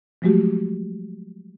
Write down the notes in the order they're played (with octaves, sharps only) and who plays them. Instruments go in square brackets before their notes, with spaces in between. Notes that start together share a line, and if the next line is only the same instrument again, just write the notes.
[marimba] F3 F#3 G#3 A3 F#4 G4